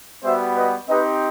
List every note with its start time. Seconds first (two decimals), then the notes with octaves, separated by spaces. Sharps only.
0.24 G3 B3 F#4 C5 E5
0.56 B4 D#5
0.88 C4 D#4 G4 B4 D#5